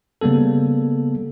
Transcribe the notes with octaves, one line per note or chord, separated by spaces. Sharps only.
C#3 G3 A#3 B3 A4